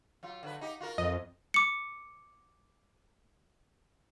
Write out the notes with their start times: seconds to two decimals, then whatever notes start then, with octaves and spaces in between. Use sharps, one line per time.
0.23 F#3 F4
0.43 D3 F#3 B4
0.61 D#4 G4
0.80 F4 F#4 A#4
0.98 F2 D#5
1.54 D6 C#7